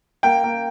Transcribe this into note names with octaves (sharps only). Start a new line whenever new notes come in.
A#3 G5
A#3